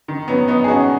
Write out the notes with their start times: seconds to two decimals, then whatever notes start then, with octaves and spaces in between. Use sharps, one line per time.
0.08 D#3
0.28 F#3 B3
0.48 B3 D#4
0.64 G#4
0.68 C#4 F#4